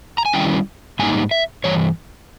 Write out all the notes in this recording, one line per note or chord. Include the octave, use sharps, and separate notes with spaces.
A#5
G#5
D#3 G3 C#4 E4 G5
G#2 G3 A#3 D#4 G#5
E5
G2 E3 C#5